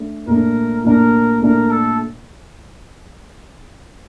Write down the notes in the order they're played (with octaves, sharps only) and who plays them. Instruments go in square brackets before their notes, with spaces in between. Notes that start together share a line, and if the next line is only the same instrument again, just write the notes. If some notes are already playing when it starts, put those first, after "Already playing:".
Already playing: [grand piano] A3 D4
[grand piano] A#2 A3 D4 [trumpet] A#4
[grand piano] A#2 A3 D4 [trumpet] A#4
[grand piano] A#2 A3 D4 [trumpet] A#4
[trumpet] A4